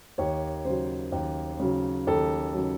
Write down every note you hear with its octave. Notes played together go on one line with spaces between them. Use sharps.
D#2 C#5
C#3 F#3 C5
D#2
C#3 F#3
D#2 A4
C#3 F#3